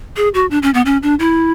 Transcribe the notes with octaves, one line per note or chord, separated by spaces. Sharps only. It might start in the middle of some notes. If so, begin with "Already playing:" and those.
G#4
F#4
D4
C#4
B3
C#4
D4
E4